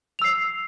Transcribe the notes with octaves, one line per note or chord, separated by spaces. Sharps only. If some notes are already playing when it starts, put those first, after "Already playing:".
E6 C7 F7